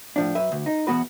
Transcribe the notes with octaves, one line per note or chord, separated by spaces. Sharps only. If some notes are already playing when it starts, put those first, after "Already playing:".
A2 F3 D4
F#2 B4 E5
D2
D#4
E2 B2 B3 F#4 B4